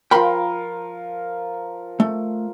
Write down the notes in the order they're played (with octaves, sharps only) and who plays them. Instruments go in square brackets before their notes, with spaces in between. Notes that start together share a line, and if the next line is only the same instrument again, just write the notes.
[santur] F3 A#4 [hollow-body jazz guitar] G5 B5 C6
[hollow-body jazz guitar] A3